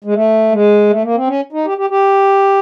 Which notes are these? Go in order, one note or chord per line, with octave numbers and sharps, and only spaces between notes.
G#3
A3
G#3
A3
A#3
C4
C#4
D#4
G4
G4
G4